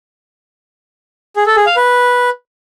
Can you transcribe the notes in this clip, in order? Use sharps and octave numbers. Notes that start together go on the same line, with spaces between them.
G#4
A4
G#4
F5
B4